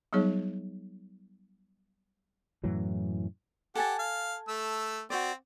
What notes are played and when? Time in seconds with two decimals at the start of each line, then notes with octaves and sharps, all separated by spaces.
0.13 F#3 G3 B3 D#4 G#4 C#5
2.64 F#2 A2 E3 F#3
3.75 G4 A4 F#5 G#5 A5
3.99 F5
4.48 A3 E6
5.10 C4 F#4 C5 D5